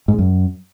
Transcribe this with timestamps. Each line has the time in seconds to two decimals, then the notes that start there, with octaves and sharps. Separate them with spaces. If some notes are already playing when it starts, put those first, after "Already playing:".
0.08 G#2
0.13 G#3
0.19 F#2